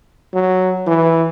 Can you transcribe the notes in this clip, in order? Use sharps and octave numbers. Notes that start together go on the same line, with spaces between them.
F#3
E3